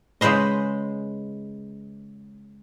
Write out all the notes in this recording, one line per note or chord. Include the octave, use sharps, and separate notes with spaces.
C#3 G#3 B4 C5 D#5